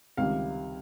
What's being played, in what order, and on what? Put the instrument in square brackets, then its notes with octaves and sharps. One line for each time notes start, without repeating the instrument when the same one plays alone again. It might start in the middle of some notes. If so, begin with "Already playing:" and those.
[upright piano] C#2 C3 D#3 G3 F5